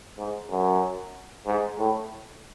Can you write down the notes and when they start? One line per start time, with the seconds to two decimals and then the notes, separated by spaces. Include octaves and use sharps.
0.19 G#2
0.51 F#2
1.46 G#2
1.79 A2